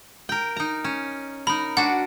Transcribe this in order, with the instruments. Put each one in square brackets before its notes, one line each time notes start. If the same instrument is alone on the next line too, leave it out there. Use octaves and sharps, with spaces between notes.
[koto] A#4 G5
D#4 A#5
C#4
[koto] D#4 A#4 [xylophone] B5
[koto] D4 F#4 [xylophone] F#5